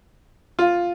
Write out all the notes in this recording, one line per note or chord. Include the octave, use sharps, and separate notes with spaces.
F4